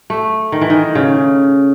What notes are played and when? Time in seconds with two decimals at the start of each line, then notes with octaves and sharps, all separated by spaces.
0.10 A3
0.52 D#3
0.61 E3
0.70 D#3
0.95 C#3